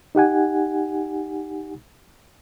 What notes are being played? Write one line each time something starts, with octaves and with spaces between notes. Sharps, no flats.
D#4 G4 F#5 G#5